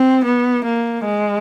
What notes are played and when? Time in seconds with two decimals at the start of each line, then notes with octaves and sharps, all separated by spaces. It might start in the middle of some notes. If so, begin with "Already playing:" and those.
Already playing: C4
0.25 B3
0.65 A#3
1.06 G#3